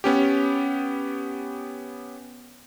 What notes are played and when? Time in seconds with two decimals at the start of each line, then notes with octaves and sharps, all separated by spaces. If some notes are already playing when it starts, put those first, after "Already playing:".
0.04 B3 C#4 G4